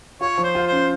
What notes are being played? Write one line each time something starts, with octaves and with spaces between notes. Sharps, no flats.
F4 C#5
F3
C5
F4
C5
C#4